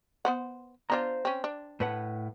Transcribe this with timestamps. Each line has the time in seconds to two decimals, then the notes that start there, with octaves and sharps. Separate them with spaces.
0.25 B3 C5 F#5
0.90 B3 D4 F4 C5 A#5
1.25 C4 C#4
1.44 D4
1.80 A2 B4 F#5